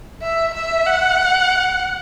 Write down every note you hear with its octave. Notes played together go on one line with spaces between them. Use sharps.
E5
E5
F#5